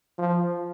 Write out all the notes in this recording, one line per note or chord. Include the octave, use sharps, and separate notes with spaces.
F3